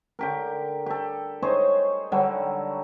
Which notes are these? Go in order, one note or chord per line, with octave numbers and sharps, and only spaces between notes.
D3 G4 A#4
G4 A4
D#4 G#4 C5 C#5
D3 F#3 G3 A4